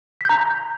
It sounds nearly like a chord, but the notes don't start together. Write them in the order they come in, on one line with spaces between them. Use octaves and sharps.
B6 G6 A#5